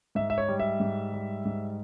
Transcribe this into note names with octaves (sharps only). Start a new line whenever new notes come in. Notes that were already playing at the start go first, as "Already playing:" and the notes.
G#2 E5
E5
C#5
G3
E5
G#2
G3
G#2